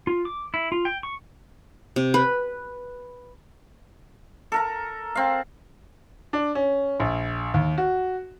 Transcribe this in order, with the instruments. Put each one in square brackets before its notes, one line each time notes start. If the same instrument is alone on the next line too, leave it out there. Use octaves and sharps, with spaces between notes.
[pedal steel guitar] F4
D6
E4
F4
G5
C#6
[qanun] C3
B4
[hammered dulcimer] A4 A#4 A#5
C4 F5
[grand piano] D4
C#4
A#1
D#2
F#4